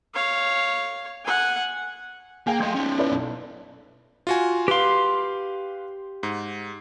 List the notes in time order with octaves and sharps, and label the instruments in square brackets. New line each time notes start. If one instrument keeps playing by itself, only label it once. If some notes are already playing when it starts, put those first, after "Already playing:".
[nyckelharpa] C#5 F5
F#5 G#5
[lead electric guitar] A#3 [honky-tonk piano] G#4 F5 G5
[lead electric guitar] A3 D#5 [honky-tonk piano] C6 G6
[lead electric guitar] C#4 D#4
[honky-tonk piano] E4 B4 D5
B1
[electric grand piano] F4 F#4 G#5
[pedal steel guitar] G4 C6 [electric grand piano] B4 F5
[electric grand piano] G#2